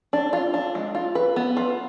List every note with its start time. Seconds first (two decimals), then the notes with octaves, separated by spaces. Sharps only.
0.13 D4
0.33 F4
0.54 D4
0.75 G#3
0.95 F4
1.15 B4
1.36 B3
1.57 F4